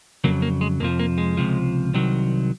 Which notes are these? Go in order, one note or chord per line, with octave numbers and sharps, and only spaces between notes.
F2 C#3 F#3 A#3
A#3
G#3
F2 C3 F3 A#3
A#3
G#3
C#2 C3 F3
C2 C3 D#3 F#3